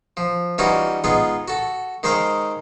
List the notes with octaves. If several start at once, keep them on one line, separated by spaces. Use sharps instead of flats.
F3
E3 G3 C#4 D#4 F4 F#4
G#3 B3 D#4 F4 G#4
F#4 A4
D#3 G#3 D#4 C5 F5 G5